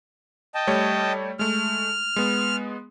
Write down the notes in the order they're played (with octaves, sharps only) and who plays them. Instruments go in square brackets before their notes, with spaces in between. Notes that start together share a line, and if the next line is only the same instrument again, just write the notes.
[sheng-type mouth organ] D#5 G5 A5
[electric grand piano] G3 A3 C#5
[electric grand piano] G#3 A3 [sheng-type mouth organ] F6
[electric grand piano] G#3 B3